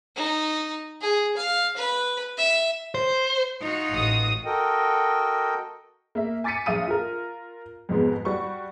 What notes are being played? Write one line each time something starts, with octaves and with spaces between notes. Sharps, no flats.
D#4
G#4
F5
B4
E5
C5
D#4 F4 F#4
A1 D#6
F#4 A4 A#4 D#5 G5
A#3 E5
G#5 D6 A6 B6 C#7 D#7
A#1 E5 F5 D#6 D#7
F4 A#4
F2 G#2 B2 G#3 B3
G3 F#4 C#6